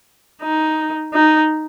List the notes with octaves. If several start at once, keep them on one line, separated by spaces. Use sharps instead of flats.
D#4
D#4